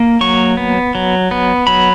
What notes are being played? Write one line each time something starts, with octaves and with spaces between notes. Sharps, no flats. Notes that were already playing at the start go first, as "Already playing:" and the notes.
Already playing: A#3
F#3 C#6
B3
F#3
B3
F#3 B5